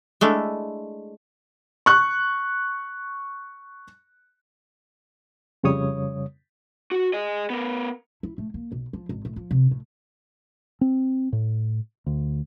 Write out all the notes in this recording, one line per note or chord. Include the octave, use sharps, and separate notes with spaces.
G#3 A3 D4 E4
C#6 F#6
F2 C#3 G3 C#5 D#6
F#4
G#4 D#5
B3 A#4
E4
A3
A#3
B1
F3
G#1
A2
F3
C3
A2
C4
A2
D2